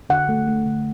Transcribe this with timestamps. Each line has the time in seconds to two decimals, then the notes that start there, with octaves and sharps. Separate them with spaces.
0.10 D3 F#5
0.29 A3
0.47 A3
0.66 D3